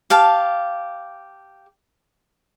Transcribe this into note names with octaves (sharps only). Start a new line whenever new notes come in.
G4 F5 A5